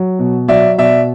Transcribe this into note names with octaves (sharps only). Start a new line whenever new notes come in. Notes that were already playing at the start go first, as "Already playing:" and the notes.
Already playing: F#3
B2
F#3 D5 E5
B2 D5 E5